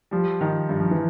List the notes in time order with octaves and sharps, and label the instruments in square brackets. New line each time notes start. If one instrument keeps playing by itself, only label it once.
[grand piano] F3 [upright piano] G3
[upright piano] D#3
G2
[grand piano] F3
E3